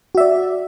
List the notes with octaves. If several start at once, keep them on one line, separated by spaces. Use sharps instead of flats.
F#4 D5 E5